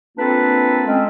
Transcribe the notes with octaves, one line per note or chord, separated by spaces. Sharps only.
A#3 C4 D4 F4 A4 B4
G#3 C4 C#4